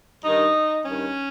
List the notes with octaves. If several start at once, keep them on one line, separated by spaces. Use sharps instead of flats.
G2 D#3 D#4
G2 D#3 C#4